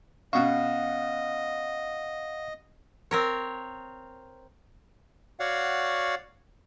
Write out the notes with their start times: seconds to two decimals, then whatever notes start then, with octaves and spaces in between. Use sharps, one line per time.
0.33 B2 C#4 D#5 F5 F#5 C#6
3.11 C4 A#4 C#5
5.40 F#4 C#5 D5 F5 F#5